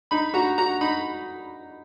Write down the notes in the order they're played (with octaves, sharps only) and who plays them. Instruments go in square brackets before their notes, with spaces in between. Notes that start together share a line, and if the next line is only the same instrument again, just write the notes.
[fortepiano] D#4 [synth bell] B5
[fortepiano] F#4 [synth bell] A#5
[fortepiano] F#4 [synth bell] A#5
[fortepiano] D#4 [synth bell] B5